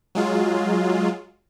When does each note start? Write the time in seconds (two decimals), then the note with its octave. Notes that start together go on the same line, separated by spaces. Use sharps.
0.15 F#3 G#3 F4